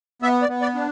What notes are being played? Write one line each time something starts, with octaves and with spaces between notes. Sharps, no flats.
B3 E5
D5
B3
D5
D4